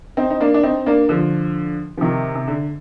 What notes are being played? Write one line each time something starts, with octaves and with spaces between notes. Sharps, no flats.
C4 D#4
D#4
A#3 D4
D4
C4 D#4
A#3 D4
D3 F3
F3
C3 D#3
C3
D3